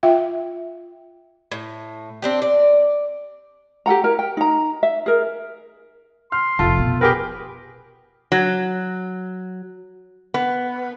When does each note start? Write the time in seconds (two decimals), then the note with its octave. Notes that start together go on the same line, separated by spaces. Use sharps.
0.03 F4 E5 F5 G5
1.52 A2
2.22 C4 D4 G4
2.42 D5
3.86 G4 A4 F#5 A#5
4.04 E4 A#4 A#5
4.19 G5
4.37 D#4 A#5
4.83 E5
5.06 G#4 A#4
6.32 C6 F6
6.59 F1 A3 F4 A5
6.79 B2
7.01 G4 G#4 A#4 B4
8.32 F#3
10.34 B3